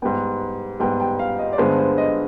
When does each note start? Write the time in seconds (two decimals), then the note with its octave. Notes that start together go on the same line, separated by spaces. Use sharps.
0.02 G#2 G3 B3 G5
0.80 G#2 G3 B3 G5
1.00 G5
1.19 F5
1.39 D#5
1.53 D5
1.58 G2 D3 G#3 B3 C5
1.78 C5
1.98 D#5